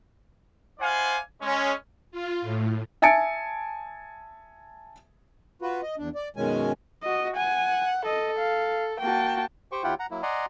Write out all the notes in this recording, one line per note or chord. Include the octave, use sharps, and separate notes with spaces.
E4 C5 D5 F5 F#5 G#5
G#3 C#4
F4
A2
E5 G#5 A5 A6 C#7 D7
F4 F#4 B4
D#5
E2 D4
D5
F#2 B2 D#3 G#3 C#4 G#5
F#4 D#5
F#5 G#5
A4 D#5
F5
A#3 F#4 G5 A5
G4 C5 G5 C#6
D#2 E4 F4 G4 F#5 G5
F#5 A#5
F#3 A#3 E4
D5 D#5 F#5 G#5 A#5 C6